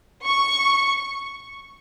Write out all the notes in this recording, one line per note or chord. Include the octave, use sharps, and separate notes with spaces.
C#6